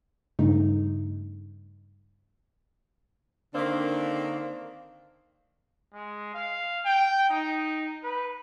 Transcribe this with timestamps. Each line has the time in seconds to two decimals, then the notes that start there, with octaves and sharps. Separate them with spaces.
0.39 G2 C#3 A3 D#4
3.54 D3 D#3 A#3 C4 D4
5.94 G#3
6.34 F5
6.85 G5
7.30 D#4
8.04 B4